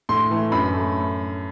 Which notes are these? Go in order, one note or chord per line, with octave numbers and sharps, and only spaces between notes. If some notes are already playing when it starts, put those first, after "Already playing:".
A2 C6
E3 A3
F#2 B5
A3